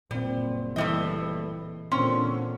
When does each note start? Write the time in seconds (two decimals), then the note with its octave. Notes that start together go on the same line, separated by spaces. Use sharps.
0.11 F#1 A#2 G3 C4
0.76 A2 E3 G3 E4 D#5 E5
1.92 A#2 D3 C4 C#4 C6